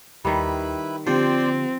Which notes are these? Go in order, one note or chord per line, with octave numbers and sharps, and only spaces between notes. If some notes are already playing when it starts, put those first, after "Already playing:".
D#2 D#3 G3 E4 B4 B5
D3 F3 C4 F4 G4 C5 D5 G5